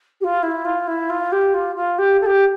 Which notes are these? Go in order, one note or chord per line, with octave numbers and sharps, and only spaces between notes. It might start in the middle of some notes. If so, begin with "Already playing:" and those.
G4
F4
E4
F4
E4
F4
G4
F4
F4
G4
A4
G4